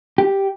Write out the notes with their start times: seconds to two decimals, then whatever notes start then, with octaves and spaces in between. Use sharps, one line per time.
0.18 G4